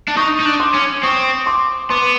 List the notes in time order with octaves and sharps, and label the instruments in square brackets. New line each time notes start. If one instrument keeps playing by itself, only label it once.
[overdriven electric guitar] D4
[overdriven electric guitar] D#4 [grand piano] C#6 D#6
[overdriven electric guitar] D#4
D4
[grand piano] C6 D6
[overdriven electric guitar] C#4
[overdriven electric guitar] C4 [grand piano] C#6 D#6
[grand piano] C6 D6
[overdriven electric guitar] B3 [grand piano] C6 D6